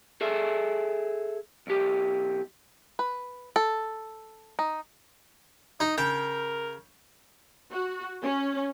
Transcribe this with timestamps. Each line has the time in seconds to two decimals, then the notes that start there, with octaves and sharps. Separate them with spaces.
0.21 G#4 A4 E5
1.67 B1 G4
2.99 B4
3.56 A4
4.59 D#4
5.80 D#4 D#5
5.98 C#3 A#4 G5
7.72 F#4
8.23 C#4